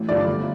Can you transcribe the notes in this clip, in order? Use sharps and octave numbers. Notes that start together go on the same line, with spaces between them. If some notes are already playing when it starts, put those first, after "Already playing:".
Already playing: A1
G2 D3 F3 D5
G1